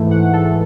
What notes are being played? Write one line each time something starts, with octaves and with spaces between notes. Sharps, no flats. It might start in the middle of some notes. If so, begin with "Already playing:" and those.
Already playing: G#2 E3 A3
F#5
A4